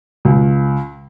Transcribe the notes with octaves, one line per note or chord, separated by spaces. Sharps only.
C#2